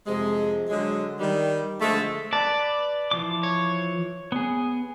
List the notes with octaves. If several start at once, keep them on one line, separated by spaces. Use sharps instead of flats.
F2 C3 G#3
D3 F#3 G#3
D#3 G3
D3 F3 G#3 A3
B4 D5 A5
E3 F3 D6
C#5
B3 G#4